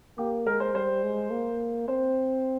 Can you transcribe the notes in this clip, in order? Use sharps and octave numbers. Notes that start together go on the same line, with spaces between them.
A#3 G4
G#3 A#4
C5
G3 C5
G#3
A#3
C4 C5